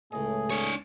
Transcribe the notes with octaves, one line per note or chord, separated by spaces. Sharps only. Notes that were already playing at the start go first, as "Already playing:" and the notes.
C#2 A2 A3 G#4 D#5
D4 C#5